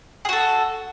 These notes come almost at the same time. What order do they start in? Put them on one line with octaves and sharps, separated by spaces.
G#4 F#4 A4